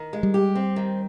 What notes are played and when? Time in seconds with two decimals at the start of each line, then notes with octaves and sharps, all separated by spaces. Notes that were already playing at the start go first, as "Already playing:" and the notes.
Already playing: D#3
0.13 G#3
0.23 G3
0.34 G4
0.55 C4
0.76 D#3